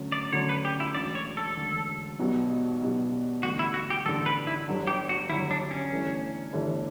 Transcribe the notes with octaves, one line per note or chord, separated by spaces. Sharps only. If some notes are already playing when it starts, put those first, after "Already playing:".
Already playing: D2 D3 F#3 C#4
D5
D2 D3 F#3 C#4 C#5
B4
G4
E4
E1 D2 D3 D5
C#5
A4
E1 D2 D3
B1 B2 G3 B3
B1 B2 G3 B3
A1 G2 D3 F#4
E4
F#4
G4
A1 G2 D3 A4
B4
E4
G1 G2 D3 F#3
G4
F#4
G1 G2 D3 F#3 E4
D4
C#4
G1 G2 E3 A3 D4
G1 G2 E3 A3 D4